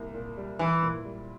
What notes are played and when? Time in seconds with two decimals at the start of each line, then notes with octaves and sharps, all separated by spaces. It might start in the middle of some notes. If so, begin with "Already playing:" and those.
Already playing: C2 A#3
0.14 A#2
0.37 G3
0.59 E3 E4
0.83 A#2
1.05 G3